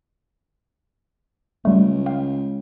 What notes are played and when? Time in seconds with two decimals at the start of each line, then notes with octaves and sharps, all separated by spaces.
1.65 C#2 G3 A3
2.06 F5 G5